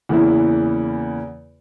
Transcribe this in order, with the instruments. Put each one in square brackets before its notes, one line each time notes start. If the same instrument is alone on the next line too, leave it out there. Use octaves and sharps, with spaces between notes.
[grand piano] E2 C#3 E3 A#3 E4